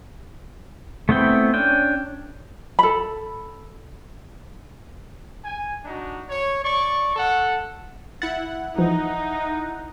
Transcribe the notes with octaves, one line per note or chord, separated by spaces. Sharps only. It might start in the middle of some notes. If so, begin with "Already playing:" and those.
A3 B3 C4 E4 G5
C#4 D4 G5
A4 B5
G#5
D4 D#4 F#4
C#5
D5 C#6
A4 F#5
E4 F#5 A6
E3 F3 D#4